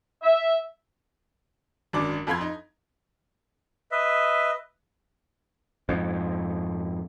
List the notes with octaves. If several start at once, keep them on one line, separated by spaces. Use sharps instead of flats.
E5
G#1 F#2 D4 D6
F2 A4 F5 B5 C6 G#6
D#4
B4 D#5 E5
F2 G#2